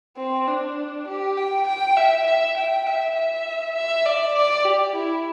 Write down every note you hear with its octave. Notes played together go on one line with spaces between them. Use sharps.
C4
D4
G4
G5
G5
E5
E5
G5
E5
E5
E5
D5
D5
G4
E4